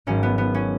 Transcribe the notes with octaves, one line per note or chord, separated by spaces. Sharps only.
G#1 G#2 F#3 C#4
B3
B3
C#4